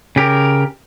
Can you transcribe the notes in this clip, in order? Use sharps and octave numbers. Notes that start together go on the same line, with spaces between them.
C#3 G4 A#4